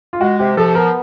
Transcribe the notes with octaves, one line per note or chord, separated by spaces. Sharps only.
F4
G#3 F#4
C3 G4
F3 A4
B3 A#4